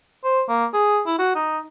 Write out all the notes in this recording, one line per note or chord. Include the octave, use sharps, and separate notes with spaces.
C5
A#3
G#4
E4
F#4
D#4